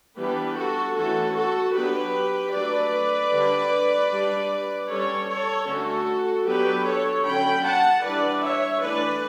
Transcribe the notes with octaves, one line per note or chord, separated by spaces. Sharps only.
E3 G3 B3 D4 G4 B4
F#4 A4
E3 A3 C#4 F#4 A4
F#4 A4
F#3 B3 D4 G4 B4
F#3 A3 D4 B4 D5
D3 G3 D4
G3 D4
G3 C#4 A4 C#5
A4 C#5
D3 A3 C#4 F#4 A4
F#3 B3 D4 G4 B4
A4 C#5
D3 F#3 C#4 G5 B5
F#5 A5
E3 G3 D4 B4 D5
C#5 E5
E3 A3 D4 B4 D5